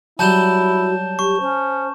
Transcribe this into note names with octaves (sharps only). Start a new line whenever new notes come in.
F#3 G3 E4 F#4 A5 G6 E7
G4 C#6
C#4 C5